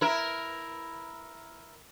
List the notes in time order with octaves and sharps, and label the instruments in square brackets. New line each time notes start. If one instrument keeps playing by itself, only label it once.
[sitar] E4 A#4